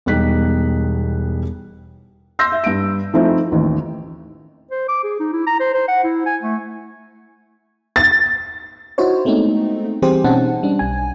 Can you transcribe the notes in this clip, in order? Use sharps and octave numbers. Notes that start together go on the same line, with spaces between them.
E1 B2 G3 D#4 F#6 B6
C6 E6 G6 A#6
E5
G2 D7
F3 A3 C4 D#4 E4
A1 D#2
C5
D6
G#4
D#4
E4
A#5
C5
C5
F#5
E4
G#5
A3
A6
D#4 E4 F#4 C5 C#5
G#3 A3 B3 C4 D#4
E3 G3 C4 G4 G#4 C5
B2 C4 C#4 D#4 F#5 A5
G3 C#4 D4
B1 G#5